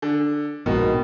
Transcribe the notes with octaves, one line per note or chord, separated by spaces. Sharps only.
D3
A#1 G#2 B2 D#3